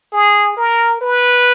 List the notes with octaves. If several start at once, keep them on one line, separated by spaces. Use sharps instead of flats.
G#4
A#4
B4